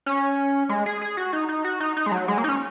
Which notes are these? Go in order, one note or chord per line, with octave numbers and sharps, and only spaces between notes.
C#4
G#3
G#4
G#4
F#4
D#4
D#4
F#4
D#4
D#4
G#3
F#3
G#3
A#3
D#4
C#4